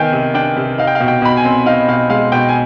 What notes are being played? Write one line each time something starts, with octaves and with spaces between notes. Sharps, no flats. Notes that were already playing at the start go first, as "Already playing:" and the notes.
Already playing: C3 D#3 B3 F5 G5 G#5
C3
D4 G5
C3
D#4 F5
G5
F5
B2
G5
B2 B5
G#5
C4
D#4 F5
B2 F5
G#3 F5
B2 G5
G#5